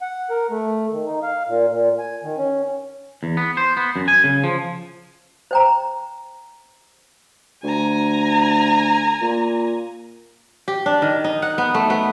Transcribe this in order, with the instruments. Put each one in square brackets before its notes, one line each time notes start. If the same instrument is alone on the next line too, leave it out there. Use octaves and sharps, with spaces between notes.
[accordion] F#5
A#4
A3
D#3
D#4
F5
A#2
A#2
G#5
D#3
C#4
[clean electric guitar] E2
B3
C5
B3
F#2
G#5
C#3
F3
[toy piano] C5 G5 A#5
[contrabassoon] D2 [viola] G#5 A#5
[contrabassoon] A#2
[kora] G4
D4
D#3
D#4
F#5
B3
A3
B3